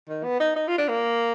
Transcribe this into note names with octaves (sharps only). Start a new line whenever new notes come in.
D#3
B3
D#4
D#4
F4
D4
A#3